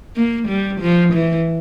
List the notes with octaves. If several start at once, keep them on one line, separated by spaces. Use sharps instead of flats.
A#3
G3
F3
E3